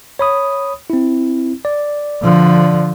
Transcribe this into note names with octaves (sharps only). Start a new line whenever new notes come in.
C#5 B5 D#6
C4 E4
D5
D3 F3